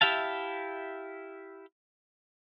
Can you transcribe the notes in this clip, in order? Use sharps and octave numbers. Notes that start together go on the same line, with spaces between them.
E4 G4 E5 F5 A5